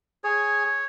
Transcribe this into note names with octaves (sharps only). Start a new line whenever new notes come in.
G#4 C#5